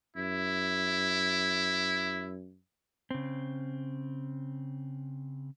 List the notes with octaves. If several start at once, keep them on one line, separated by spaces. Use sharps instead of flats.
F#2 E4
C#3 C4